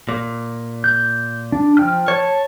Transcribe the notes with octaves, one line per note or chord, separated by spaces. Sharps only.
A#2
G6
D4
F3 G5 F6
C#5 A5